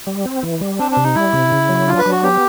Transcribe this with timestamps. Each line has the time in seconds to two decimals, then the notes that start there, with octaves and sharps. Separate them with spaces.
0.07 G3
0.25 C4
0.43 E3
0.61 G3
0.79 C4 D4
0.91 D4
0.97 C3
1.03 D#4
1.15 G3 E4
1.33 C3
1.52 C#3
1.69 F#3
1.87 D4 F4
1.99 B4
2.06 F#3
2.11 F#4
2.23 B3 G4